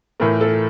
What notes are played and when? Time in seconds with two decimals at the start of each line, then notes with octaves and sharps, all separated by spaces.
0.20 A2 E3 A3 A#4
0.41 A4